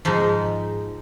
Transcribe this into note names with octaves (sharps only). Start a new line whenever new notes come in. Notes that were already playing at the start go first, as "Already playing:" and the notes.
G#2 F3 G#3 D#4